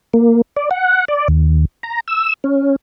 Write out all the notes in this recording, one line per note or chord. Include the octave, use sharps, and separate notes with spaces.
A#3
D5
F#5
D5
D#2
A#5
E6
C#4